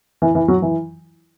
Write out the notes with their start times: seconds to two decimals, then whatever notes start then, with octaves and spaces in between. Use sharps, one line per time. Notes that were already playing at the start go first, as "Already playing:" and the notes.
0.22 E3
0.35 E3
0.48 F#3
0.62 E3